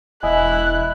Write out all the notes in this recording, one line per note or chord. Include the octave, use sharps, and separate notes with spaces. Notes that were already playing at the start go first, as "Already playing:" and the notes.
E1 E4 D#5 G#5 F#6